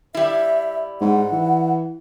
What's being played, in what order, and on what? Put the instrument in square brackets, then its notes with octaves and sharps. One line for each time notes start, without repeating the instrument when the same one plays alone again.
[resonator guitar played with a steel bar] G3 E4 [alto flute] E5
[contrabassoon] G#2 [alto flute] F#5
[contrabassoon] E3